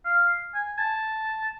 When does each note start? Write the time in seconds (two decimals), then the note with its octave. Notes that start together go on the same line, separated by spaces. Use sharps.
0.05 F5
0.54 G#5
0.78 A5